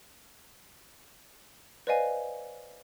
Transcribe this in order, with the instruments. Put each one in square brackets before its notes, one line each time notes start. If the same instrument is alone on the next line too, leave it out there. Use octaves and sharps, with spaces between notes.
[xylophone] B4 C5 D5 D#5 F5 G#5